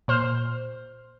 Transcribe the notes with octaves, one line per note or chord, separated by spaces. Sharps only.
A#2 C5 F6